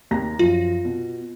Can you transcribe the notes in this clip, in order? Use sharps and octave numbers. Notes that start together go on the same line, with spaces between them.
D#2 A#5 A#6
F#2 F3 F4
B2